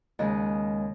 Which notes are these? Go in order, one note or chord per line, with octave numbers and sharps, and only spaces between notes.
D#2 C#3 G#3 D#5